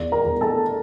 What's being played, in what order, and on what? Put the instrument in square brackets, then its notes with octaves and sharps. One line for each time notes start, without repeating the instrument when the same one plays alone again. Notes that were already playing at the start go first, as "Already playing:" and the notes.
Already playing: [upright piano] E2 D5
A#4 A#5
E2
A4 A5